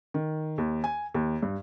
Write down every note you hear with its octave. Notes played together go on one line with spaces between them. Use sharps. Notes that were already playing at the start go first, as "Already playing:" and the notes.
D#3
D#2
G#5
D#2
G2